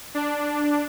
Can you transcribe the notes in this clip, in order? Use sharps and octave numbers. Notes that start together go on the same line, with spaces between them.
D4